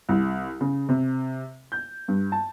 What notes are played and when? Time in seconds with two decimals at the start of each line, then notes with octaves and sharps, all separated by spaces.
0.09 C2
0.61 C#3
0.89 C3
1.72 G6
2.08 G2
2.32 A5